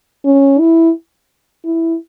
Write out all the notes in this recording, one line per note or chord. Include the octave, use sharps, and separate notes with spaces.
C#4
E4
E4